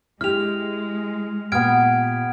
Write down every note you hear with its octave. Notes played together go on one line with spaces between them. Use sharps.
G#3 E4 G4 F6 F7
A#2 B3 G4 F6 G#6 D7